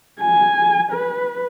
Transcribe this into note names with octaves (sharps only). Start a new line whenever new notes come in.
G#5
B4